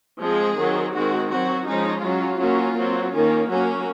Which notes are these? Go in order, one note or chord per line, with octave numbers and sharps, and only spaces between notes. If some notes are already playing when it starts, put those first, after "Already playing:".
F3 G#3 C4 G#4
D#3 F#3 C4
D#3 G#3 C4 F#4
F#3 C4 F#4
F3 G#3 C#4 D#4
F#3 C#4 F4
F#3 A#3 C#4
F#3 C4
D#3 A#3 C#4
F#3 A#3 C#4 F#4